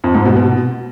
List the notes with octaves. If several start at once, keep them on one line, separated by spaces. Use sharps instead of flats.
F2
G#2
B2
B2